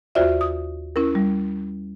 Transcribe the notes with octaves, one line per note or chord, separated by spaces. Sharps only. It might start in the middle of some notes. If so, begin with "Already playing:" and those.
D#2 F4 F#4 C5 D5 E5
D#6
C#4 E4 A#4
G3